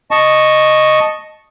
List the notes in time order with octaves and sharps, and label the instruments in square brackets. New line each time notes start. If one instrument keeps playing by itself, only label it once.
[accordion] D#5 A5 C#6